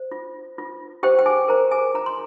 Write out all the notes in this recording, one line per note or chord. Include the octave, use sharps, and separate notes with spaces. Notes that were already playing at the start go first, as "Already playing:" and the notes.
Already playing: C5
F4
F4
G4 C5 G5
G5
G#4 G#5
A#4 C5 A#5
G#4 G#5
F4 A#5
C6